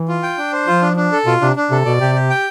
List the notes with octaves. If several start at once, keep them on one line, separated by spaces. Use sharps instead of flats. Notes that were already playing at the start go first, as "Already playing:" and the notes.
Already playing: E3
F4
G5
D4
C5
F3 F4
D4
D4
A4
B2 F4
C3 D4
D4
C3 A4
B2 D5
C3 G4
G4
G5